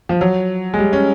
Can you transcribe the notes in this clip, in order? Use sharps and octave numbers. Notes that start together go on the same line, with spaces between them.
F3
F#3
G#3
G3
C#4